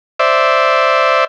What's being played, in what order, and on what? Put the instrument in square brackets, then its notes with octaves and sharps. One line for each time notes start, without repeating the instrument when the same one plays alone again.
[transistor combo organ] C5 D5 E5